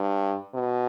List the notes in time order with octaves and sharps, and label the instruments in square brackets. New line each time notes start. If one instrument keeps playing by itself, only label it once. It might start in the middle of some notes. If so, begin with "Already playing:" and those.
Already playing: [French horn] G2
B2